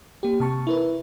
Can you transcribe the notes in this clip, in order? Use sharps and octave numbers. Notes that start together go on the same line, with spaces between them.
A#3 G4
C3 A5 C#6
E4 A#4 B4